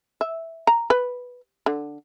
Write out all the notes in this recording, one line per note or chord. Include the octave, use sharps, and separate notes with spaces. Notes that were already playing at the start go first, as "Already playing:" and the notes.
E5
A#5
B4
D3